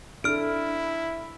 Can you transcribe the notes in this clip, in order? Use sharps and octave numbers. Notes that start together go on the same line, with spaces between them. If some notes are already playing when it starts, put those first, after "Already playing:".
D4 E4 A4 F6 D7